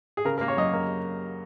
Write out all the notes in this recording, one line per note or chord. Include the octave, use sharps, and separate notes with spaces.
G#4
C#3 A#4
A#3 A#4
C#5
F#2 D#5
A#3